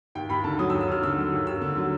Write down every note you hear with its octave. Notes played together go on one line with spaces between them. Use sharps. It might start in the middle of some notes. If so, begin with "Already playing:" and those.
D#2 G5
D#2 B5
D3 A5
F#3 D#6
E6
D#2
E6
D#2 F6
D3 E6
F#3
D#2
D#2 E6
D3
F#3